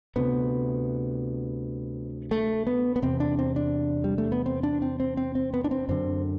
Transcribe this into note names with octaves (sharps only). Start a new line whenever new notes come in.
D2 C3 B3
A3
B3
B3
E2 C3 C4
D4
C4
D4
G3
A3
B3
C4
D4
C4
C4
C4
C4
B3
D4
C4
F#2 D3 C4